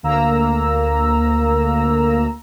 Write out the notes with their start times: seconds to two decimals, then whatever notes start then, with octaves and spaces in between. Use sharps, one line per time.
0.03 D2 A#3 A#5 E6